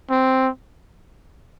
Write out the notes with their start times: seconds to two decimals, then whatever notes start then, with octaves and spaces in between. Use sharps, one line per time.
0.10 C4